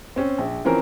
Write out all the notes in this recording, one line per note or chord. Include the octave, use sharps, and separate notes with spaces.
C4 C#4
A#1
E3 F3 C4 C#4 A#4